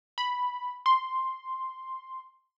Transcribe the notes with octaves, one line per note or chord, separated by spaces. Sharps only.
B5
C6